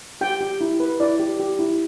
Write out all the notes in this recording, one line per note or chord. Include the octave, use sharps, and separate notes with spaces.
G4 G5
G4
E4
B4
E4 D5
G4
G4
E4